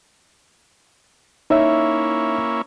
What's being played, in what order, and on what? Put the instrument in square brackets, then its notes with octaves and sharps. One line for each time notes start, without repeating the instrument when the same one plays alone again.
[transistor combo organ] A#3 C#4 E4 [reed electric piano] D#4 C#5 E5